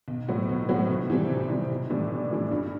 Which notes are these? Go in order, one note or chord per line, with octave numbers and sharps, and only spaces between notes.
B1
A2 F#3 C4 F#4
B1
A2 F#3 C4 F#4
C2
C3 E3 G3 C4
C2
C3 E3 G3 C4
B1
A2 E3 G3 D4
B1
A2 E3 G3 D4
G2